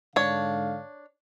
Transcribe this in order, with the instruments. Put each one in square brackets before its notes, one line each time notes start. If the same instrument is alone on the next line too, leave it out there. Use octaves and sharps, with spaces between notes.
[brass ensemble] G#2 D3 F5 [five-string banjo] D4 C#5